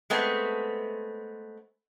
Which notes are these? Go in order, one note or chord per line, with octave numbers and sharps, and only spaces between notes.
G#3 A3 B3 C4